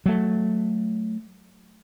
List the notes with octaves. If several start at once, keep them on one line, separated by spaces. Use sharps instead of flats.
F#3 A3